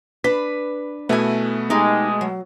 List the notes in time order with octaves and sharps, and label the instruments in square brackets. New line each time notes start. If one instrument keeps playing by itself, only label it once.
[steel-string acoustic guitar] D4 B4 [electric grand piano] B6
[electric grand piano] B2 A3 B3 [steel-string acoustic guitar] E4 G#5
[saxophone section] G#3 [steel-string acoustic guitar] D#4 G4
[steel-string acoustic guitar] F#3